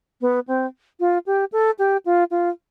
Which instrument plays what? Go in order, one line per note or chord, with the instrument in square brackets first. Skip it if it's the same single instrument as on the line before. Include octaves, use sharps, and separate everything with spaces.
[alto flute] B3
C4
F4
G4
A4
G4
F4
F4